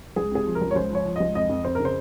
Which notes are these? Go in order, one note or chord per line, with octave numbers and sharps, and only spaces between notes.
C#2 G#4
C3 G#4
F3
A#4
C#2
C#5
C#2 C5
F3 C#5
F3
C#2 D#5
F2 D#5
F2
F2 C5
C#3 A#4
C5